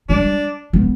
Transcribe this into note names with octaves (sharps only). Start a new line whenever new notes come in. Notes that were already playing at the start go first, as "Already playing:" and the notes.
G3 D4
B3